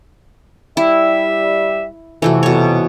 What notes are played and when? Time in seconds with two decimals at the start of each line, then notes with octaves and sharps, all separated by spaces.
0.77 G3 E4 E5
2.22 F2 C3 E3 A3 F#4
2.43 B2 C#5